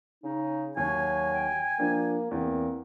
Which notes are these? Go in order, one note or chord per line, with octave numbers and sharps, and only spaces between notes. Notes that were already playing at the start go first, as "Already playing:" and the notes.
C#3 D#4
D#2 F#3 C#5 G#5
G5
F3 A#3 D4
E2 A#3 C4